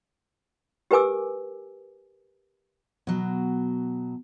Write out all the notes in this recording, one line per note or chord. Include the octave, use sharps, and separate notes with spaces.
G4 A#4 B4 G#5 D6 E6
B2 F#3